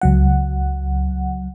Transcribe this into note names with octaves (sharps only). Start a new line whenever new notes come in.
C#2 F#3 F#5